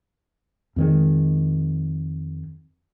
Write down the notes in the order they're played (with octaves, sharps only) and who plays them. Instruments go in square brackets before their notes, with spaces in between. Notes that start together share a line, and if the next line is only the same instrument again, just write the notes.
[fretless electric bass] F2 D#3 G#3